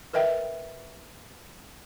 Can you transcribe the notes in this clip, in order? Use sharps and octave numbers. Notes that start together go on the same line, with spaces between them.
A#4 B4 D#5 E5 G5